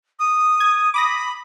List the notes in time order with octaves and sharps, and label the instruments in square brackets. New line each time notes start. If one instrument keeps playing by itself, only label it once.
[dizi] D#6
[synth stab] G#6
[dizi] B5 [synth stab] D6 D#6 A#6